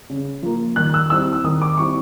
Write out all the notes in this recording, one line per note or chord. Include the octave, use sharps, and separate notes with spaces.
C#3
F3 A#3
D#3 F#6
E6
G3 C4 E4 E6
E6
D#3 D#6
D6
G3 C4 E4 C#6